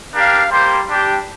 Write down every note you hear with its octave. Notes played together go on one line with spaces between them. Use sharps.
D4 G4 A#4 F5
G3 A#3 G4 C5
G3 D4 G4